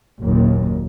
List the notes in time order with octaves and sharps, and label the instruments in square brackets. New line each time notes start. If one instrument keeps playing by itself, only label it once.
[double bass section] F#1 D#2 A#2